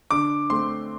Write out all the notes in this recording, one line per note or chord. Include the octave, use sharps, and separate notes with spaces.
D3 D6
A3 C4 C6